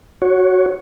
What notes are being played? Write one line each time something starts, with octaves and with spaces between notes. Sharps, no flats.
F#4 C#5